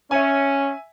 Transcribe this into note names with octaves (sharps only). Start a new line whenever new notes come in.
C#4 E5 G#5